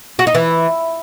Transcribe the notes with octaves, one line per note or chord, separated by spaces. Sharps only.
F#4
D#4
E3